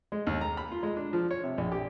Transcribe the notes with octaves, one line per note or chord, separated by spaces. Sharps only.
G#3
D#2
A#5
B5
F4
G#3
D4
F3
C#5
C3
A#1
G4